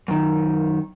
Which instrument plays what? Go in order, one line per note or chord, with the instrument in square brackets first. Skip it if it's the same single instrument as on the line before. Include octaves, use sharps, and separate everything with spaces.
[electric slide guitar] F#2 D#3